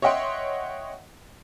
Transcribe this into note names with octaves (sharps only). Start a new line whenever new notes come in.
C#5 D#5 E5 F#5 G5 C6